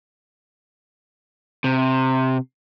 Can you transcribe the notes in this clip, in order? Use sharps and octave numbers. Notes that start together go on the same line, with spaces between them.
C3